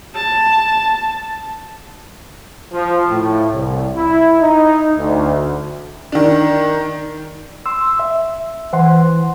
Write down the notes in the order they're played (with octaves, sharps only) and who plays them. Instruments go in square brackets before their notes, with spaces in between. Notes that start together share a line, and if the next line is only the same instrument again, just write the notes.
[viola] A5
[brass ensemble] F3
A2
C2
E4
D#4
D2
[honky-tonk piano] D#3 D4
[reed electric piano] C6 E6
E5
[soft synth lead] E3 [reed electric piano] C5 F#5 C6